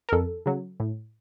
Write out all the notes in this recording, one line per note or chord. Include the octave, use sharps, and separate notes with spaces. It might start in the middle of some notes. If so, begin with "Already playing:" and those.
A#4
F2 A4
C#3 F#3
A2